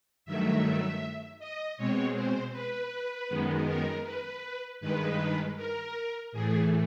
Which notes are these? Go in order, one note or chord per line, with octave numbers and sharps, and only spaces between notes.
G2 D#3 F#3 A3 E5
D#5
B2 G#3 C4 C#5
C5
B4
F#2 D#3 G#3 B3
A#4
B4
G2 D#3 G#3 B4
A#4
A2 E3 A3 G#4